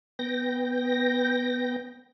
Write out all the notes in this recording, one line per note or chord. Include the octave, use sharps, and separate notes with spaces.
B3 G5 A#6